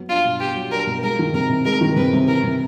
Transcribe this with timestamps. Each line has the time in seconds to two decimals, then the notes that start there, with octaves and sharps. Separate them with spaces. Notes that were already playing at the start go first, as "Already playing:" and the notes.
Already playing: F#3 B3
0.09 D4 F4
0.25 B2
0.40 B3 G4
0.56 F#3
0.71 D4 A#4
0.87 B2
1.03 G#3 A#4
1.19 D#3
1.34 C3 A#4
1.50 C3
1.65 G#3 A#4
1.81 D#3
1.96 C3 B4
2.13 C3
2.28 E3 A#4
2.43 C3